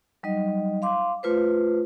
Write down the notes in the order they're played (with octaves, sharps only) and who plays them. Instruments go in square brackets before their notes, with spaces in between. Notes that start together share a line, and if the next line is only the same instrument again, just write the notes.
[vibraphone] F#3 G3 D#4 D#5
F5 C6 D6
A3 F4 B4 C5